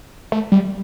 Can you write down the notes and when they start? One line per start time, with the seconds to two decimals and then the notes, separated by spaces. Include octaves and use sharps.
0.32 A3
0.52 G3